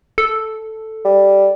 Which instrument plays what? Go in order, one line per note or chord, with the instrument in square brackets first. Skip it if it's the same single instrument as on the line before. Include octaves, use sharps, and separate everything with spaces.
[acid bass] A4
[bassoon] G3